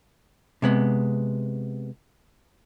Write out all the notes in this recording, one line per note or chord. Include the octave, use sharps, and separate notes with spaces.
C3 G#3 B3